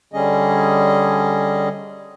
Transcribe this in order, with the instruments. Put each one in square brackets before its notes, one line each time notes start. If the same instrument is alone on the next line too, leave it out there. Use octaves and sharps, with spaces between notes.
[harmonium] D3 G3 C#4 G#4 D#5